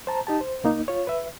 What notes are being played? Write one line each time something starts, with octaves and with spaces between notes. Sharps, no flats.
C5 A5 A#5
D#4 G4 A5
C5
C#2 A#3 D#4
F4 C#5
B4 E5